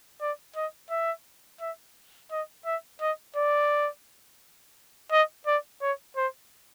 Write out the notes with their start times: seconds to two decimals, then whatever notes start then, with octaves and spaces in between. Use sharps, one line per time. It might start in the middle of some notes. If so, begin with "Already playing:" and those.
0.21 D5
0.56 D#5
0.90 E5
1.61 E5
2.31 D#5
2.65 E5
3.01 D#5
3.36 D5
5.12 D#5
5.46 D5
5.81 C#5
6.17 C5